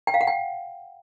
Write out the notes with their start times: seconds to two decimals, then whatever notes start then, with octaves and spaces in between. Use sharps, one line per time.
0.07 G5
0.14 F5
0.21 F#5
0.27 G5